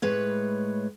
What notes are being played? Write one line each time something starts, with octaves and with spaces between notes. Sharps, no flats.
A2 G#3 B4 C#5